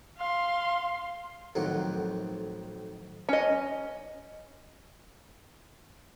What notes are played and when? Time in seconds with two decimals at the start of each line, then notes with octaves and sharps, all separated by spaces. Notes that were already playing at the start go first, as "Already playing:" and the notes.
0.17 F5 C6
1.55 B1 F2 A2 D#3 F#5
3.29 C#4 D#5